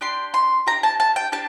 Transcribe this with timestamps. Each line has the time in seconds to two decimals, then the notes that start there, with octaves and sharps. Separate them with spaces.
0.01 D4 G4 C6
0.34 C6
0.67 D4 G4 A#5
0.83 A5
1.00 A5
1.16 G5
1.32 D4 G4 A5